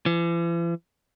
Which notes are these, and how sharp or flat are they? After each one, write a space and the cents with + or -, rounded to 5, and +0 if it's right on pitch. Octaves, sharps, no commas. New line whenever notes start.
E3 +45